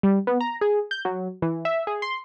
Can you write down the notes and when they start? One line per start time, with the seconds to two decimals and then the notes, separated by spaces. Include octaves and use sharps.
0.03 G3
0.27 B3
0.41 A#5
0.61 G#4
0.91 G6
1.05 F#3
1.42 E3
1.65 E5
1.87 G#4
2.02 C6